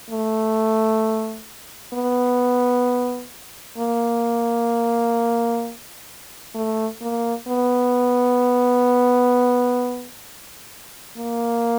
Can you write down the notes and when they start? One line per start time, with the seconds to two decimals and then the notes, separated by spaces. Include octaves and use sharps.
0.10 A3
1.93 B3
3.78 A#3
6.55 A3
7.01 A#3
7.48 B3
11.17 A#3